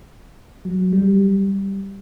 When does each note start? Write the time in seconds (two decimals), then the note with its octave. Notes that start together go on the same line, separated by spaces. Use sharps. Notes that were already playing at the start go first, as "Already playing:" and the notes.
0.65 F#3
0.93 G3